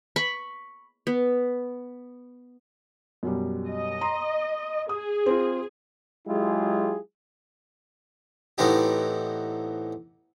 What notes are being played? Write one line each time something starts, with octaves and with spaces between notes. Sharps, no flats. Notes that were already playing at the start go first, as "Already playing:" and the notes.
B5 C#6
B3
F#2 B2 G3
D#5
A#5 C6
G#4 D#6
C4 F4
F#3 G#3 E4 F4 G4 G#4
A2 E3 B3 C4 D#4 G4